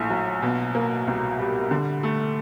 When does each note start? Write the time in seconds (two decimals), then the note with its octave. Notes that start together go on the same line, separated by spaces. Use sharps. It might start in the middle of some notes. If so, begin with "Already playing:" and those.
Already playing: A#1 A2 A3
0.10 F#3
0.42 B2
0.75 A#3
1.07 C2
1.39 G3
1.71 D3
2.03 A3